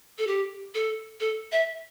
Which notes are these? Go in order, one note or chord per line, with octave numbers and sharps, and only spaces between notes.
A4
G4
A4
A4
E5